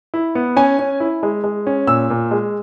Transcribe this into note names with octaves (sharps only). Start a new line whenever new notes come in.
E4
B3
C#4 G#5
C#4
E4
G#3
G#3
C#4
A#2 E6
A#2
G#3